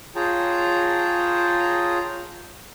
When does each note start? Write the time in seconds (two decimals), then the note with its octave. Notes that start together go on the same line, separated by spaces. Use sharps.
0.16 F4 G#4 C#5 G5 A5 A#5